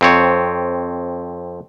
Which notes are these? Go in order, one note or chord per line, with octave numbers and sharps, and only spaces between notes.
F2 C4 C#5